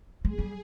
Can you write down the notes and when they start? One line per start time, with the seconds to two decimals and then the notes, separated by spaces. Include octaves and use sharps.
0.25 G#3 G#4
0.39 G3